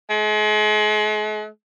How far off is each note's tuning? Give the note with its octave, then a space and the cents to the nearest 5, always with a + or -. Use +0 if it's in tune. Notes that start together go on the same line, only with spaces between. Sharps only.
G#3 +40